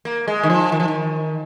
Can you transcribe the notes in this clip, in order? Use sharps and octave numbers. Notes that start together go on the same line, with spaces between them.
A#3
G#3
D#3
F3
D#3
F3
D#3